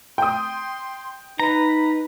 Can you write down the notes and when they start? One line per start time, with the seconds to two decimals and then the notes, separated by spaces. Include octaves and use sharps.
0.18 G5 C6 D#6
1.40 D#4 B4 A#5